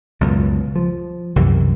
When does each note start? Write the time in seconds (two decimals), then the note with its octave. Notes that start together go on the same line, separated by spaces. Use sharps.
0.21 C#2 F#2 B2
0.76 F3
1.36 C2 F#2 E3